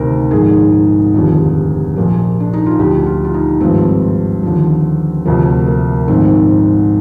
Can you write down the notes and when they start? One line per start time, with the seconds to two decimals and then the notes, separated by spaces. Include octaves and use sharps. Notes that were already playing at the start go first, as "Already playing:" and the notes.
Already playing: D2 C3 D#3 A#4 C5
0.31 A#1 G#2 D#3 G#4
1.14 F1 D#2 D3 F3
1.96 A#1 A#2 F3
2.40 D4
2.53 D#4
2.66 F4
2.79 D2 D3 F3 G4
3.06 F4
3.25 F4
3.34 D#4
3.61 G#1 G2 F3 C4
4.43 D#2 D3 F3
5.25 D2 C3 F3 A#3
5.68 A#3
6.08 A#1 G#2 D#3 C4